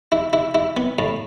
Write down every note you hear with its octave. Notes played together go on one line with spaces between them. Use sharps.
E4
E4
E4
B3
A2